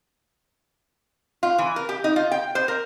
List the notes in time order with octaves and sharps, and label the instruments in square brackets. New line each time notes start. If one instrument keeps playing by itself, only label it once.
[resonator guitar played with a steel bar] F4
E3
A#4
G4
D#4
F4
G5
C5
A#4